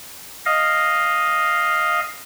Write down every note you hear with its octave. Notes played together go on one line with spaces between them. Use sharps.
D#5 F5